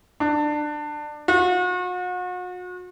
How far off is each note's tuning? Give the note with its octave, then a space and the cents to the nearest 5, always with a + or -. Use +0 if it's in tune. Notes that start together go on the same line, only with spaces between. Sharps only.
D4 +20
F#4 -40